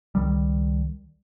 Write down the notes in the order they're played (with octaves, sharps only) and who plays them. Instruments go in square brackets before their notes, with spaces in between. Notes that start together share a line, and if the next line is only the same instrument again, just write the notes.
[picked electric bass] C#2 D#3 G3